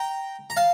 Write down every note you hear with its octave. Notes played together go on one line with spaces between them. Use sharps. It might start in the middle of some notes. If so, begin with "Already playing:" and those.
Already playing: G5 A#5
A#5
F5 A5